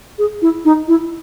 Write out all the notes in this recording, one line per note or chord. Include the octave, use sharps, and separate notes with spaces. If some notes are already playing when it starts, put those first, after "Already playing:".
G#4
E4
D#4
E4